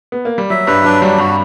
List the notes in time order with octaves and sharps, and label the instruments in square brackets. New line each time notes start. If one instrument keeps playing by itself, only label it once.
[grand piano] B3
A#3
G3
[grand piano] F#3 [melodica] E5
[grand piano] G2 G3 [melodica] B4
[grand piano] F#3 [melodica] D4
[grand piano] G2 G3 [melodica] F#3
[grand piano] G2 G3 [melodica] F#4